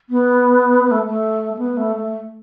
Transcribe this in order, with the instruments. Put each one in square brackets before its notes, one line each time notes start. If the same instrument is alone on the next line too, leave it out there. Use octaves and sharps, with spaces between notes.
[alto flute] B3
B3
A3
A3
A3
B3
A3
A3